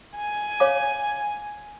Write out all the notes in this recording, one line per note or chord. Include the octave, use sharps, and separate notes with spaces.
G#5
C#5 F5 D6